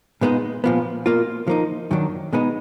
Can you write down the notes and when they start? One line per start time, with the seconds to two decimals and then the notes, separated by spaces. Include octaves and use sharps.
0.21 A#2 G#3 B3 D#4
0.64 A#2 F3 B3
1.06 B2 A#3 F4
1.47 F3 A#3 D#4
1.91 F#2 D#3 F#3 D4
2.33 B2 G#3 B3 D#4